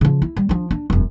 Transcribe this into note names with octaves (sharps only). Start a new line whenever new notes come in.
C#3 F3
E4
G3
F3 D4
D4
E1 F#2